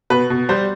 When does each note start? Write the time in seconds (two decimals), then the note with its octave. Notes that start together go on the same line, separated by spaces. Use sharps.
0.10 B2 B4
0.30 B2
0.49 G3 C5